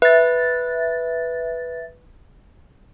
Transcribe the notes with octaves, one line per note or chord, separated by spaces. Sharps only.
B4 E5 A6